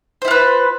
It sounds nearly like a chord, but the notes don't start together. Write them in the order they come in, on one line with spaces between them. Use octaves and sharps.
C5 E4 F4 B4